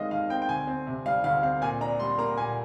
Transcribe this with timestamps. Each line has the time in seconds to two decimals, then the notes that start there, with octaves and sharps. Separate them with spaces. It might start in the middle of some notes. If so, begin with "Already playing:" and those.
Already playing: D#2 D#3 G#3 C4 D#5 F5
0.11 D#2 F5
0.30 C4 G5
0.42 G5
0.49 D2 G#5
0.67 C4
0.87 C3
1.06 G3 F5
1.24 D2 F5
1.43 C4 F5
1.62 A#2 G#5
1.81 D4 A#5
2.00 G3 C6
2.18 A#3 A#5
2.37 A#2 G#5